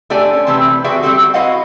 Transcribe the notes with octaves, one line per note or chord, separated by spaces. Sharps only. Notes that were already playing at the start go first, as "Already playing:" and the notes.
A3 D4 G4 D5 G5 G#5
C#4
C3 E3 A3 C4 G4 B4
F#4 G#4 B4 D5 E5 G5
G3 C4 F#4 G4 A4 F#5
E4 F#4 B4 D#5 F5 F#5